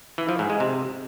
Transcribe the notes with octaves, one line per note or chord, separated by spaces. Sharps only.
E3
F3
G#2
G#3
C3